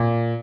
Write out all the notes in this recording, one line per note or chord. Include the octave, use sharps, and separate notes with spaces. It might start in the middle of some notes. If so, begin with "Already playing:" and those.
Already playing: A#2